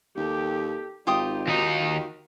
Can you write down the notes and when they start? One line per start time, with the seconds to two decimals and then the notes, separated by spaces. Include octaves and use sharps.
0.17 D#2 G4 A4
1.07 G#1 D#4 F4 G4 D#6
1.48 D#2 D#4 F#4
1.80 D#3